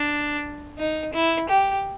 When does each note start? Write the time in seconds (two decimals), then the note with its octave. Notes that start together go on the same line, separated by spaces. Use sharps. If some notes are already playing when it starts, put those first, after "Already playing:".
Already playing: D4
0.78 D#4
1.13 E4
1.49 G4